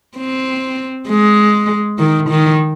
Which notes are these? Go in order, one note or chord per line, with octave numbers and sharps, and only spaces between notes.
C4
G#3
D#3
D#3